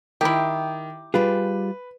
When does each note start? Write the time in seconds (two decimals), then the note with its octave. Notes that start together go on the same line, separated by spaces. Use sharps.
0.21 D#3 E4 G4
1.14 G3 F4 G#4 B4